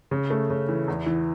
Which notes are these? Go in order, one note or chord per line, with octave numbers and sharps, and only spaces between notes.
C#3
A3
C#3
E3
E2
E3